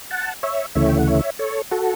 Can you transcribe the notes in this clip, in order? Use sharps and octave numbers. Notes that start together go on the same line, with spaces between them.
F#5 A5
C#5 E5
D2 C#3 E3 A3 C#5 E5
G5
F#5
C#5 E5
A4 C#5
F#4 A4